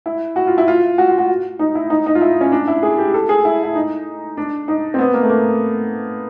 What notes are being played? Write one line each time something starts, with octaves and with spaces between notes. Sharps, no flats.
E4
F#4
F4
E4
F4
F#4
F4
F#4
D#4
E4
D#4
D#4
F4
E4
C#4
D4
E4
G#4
G4
A4
G#4
E4
E4
D#4
D4
D#4
C4
B3
A#3
A3
A#3